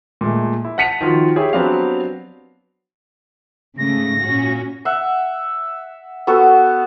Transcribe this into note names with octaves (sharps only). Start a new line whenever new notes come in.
A#2 G#3 A3
E4
F#5 A5 B6 C#7 D#7 F7
D#3 F3 F4 F#4
E4 G4 G#4 C#5
F#3 B3 C4 D4 G4 F5
G#2 C#3 A3 A#6
A#2 C#4 F#4
E5 F#5
B3 F#4 A4